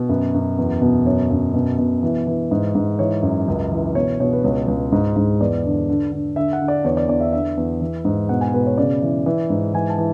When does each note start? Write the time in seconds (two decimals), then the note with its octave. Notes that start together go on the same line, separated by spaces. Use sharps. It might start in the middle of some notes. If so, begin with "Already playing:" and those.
Already playing: B2
0.09 F#2 B4
0.34 F#2
0.58 E2
0.81 B2
1.06 F#2 C#5
1.31 F#2
1.54 B2
1.79 B2
2.03 E3
2.27 E3
2.51 G#2
2.75 G#2
2.99 E3 C#5
3.23 F#2
3.48 C#2
3.71 E3
3.95 B2 C#5
4.20 B2 C#5
4.33 B4
4.44 C#2 C#5
4.68 C#2
4.92 G#2
5.16 G#2
5.41 E2 D5
5.65 D3
5.89 D3
6.12 D3
6.36 D3 E5
6.53 F#5
6.61 D3
6.68 D5
6.84 E2 C#5
6.97 D5
7.08 E2 D5
7.20 E5
7.32 D3 E5
7.57 E2
7.81 E3
8.05 G#2
8.29 B2 F#5
8.41 G#5
8.54 B2 B4
8.66 C#5
8.78 C#3 D5
9.02 E3
9.26 E3
9.50 G#2
9.74 E3 G#5
9.90 A5
9.98 E3